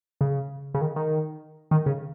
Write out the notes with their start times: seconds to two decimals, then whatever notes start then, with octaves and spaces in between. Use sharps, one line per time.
0.21 C#3
0.74 C#3
0.81 D#3
0.96 D#3
1.71 D#3
1.86 C#3